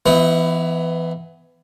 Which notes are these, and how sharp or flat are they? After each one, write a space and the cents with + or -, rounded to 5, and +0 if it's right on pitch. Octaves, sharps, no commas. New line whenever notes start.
E3 +20 B3 +20 E4 -45